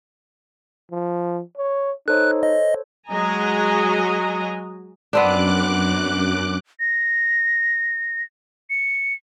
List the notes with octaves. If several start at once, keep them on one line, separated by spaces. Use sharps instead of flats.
F3
C#5
D#4 A4 C5 C#5 F#6
D#5
F#3 G#3 D#5 G#5 A#5
F#2 B3 C4 D4 D6 F#6
A#6
C#7